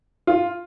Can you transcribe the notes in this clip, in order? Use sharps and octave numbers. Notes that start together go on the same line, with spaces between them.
F4